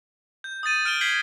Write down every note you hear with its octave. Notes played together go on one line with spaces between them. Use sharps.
G6
D#6 G6 A6 D#7
F6 D7 E7 G7
G6 G#6 B6 C7 F#7 G7